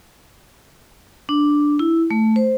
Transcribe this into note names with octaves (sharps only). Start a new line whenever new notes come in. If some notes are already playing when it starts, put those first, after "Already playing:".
D4
E4
A3
C5